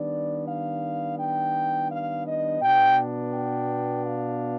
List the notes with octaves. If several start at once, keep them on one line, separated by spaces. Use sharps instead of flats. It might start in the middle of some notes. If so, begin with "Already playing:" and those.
Already playing: D#3 G3 B3 D4 D5
F5
G5
F5
D#5
B2 B3 D4 G5
G5
F5